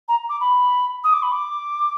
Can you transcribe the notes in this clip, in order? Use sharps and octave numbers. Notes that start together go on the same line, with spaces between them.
A#5
D6
B5
D#6
D6
B5
D6